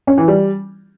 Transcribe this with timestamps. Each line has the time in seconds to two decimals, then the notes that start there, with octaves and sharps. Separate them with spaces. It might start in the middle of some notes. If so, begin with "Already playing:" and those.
0.07 C#4
0.18 E3
0.28 G3